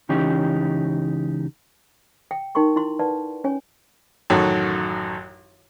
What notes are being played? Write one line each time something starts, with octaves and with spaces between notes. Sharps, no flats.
C#2 E3 C#4 D#4 G4
G5
D#4 A#4 G5 C6 C#6
E4 C6
B4 D5 F#5 A5
C#4 C#5 G#5
A1 F#2 D#3 F#4 A4 C#5